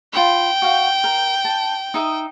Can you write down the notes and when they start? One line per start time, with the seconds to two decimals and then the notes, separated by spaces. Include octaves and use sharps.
0.13 F4 G5 B5
0.62 F#4 F5
1.04 A#4
1.45 A5
1.94 D#4 E5 D#6